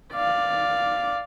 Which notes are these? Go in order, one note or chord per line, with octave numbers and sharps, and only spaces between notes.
D5 F5